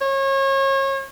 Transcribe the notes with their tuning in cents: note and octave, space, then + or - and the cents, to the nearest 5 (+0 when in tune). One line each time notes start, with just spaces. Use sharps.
C#5 -35